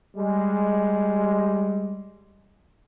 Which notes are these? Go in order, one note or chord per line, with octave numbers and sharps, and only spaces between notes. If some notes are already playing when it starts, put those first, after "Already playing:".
G3 G#3